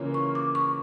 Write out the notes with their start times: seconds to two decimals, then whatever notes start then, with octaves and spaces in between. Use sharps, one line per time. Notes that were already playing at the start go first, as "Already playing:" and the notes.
Already playing: C#3 E3 A#3 C#4 F4
0.14 C#6
0.35 D6
0.55 C#6